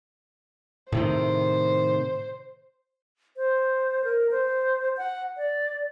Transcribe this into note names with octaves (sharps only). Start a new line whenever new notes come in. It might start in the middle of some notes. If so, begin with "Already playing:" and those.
A2 C3 D#3 C5
C5
A#4
C5
F#5
D5